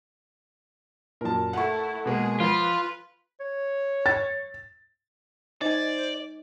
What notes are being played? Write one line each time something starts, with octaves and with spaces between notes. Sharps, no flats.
F#2 A#2 A#4 A5
A3 E4 F#5 C#6
B2 G#3 A#3 G#4
F3 F4 B4
C#5
A6
D#4 C5 D5 G#5